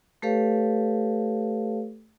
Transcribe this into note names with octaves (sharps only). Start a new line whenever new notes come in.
A3 G4 A4 B4 C#5 F5